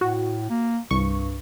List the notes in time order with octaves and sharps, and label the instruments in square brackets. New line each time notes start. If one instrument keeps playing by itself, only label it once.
[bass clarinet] A2 [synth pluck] F#4
[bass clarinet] A#3
[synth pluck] C2 C#6 [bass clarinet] G2